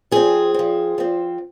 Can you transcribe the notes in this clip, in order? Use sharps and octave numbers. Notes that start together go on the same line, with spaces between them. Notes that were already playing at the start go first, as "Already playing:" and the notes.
F3 C4 G#4
F3 C4
F3 C4